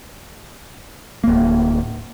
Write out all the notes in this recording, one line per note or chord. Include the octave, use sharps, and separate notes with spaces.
D1 A#3